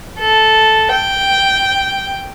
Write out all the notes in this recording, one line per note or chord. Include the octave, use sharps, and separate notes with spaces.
A4
G5